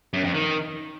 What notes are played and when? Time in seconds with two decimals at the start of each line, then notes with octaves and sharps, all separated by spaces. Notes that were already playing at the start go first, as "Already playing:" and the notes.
0.14 F#2
0.24 F2
0.34 D#3